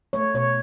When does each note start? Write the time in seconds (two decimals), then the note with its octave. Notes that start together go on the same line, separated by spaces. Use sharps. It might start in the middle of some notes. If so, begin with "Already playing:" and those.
0.13 A3 C#5
0.34 B2 C#5